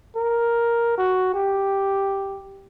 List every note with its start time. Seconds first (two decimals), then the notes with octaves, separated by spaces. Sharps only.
0.16 A#4
0.98 F#4
1.34 G4